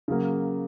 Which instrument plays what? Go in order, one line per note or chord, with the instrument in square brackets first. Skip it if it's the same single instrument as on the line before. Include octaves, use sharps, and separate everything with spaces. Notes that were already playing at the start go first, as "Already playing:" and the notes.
[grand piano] C#3 F#3 A#3